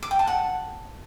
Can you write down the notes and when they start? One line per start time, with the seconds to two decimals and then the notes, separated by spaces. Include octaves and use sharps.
0.03 D6
0.11 G5
0.19 A5
0.27 F#5